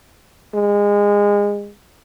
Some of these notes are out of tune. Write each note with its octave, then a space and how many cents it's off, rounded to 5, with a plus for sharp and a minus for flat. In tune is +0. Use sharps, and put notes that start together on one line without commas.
G#3 -25